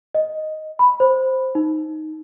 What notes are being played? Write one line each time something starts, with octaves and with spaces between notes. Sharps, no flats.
D#5
B5
C5
D#4